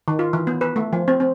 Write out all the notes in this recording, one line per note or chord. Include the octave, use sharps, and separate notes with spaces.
D#3
F4
E3
B3
B4
A3
F3
C4
C4